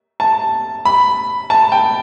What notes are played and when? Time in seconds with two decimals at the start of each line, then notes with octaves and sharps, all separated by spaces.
0.20 A5
0.85 B5
1.50 A5
1.72 G5